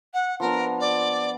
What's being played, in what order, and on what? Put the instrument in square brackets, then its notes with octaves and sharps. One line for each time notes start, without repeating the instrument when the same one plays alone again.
[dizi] F#5
[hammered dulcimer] F3 B3 D4 [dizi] A#4
[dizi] D5